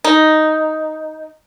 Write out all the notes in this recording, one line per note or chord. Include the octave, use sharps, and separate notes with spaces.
D#4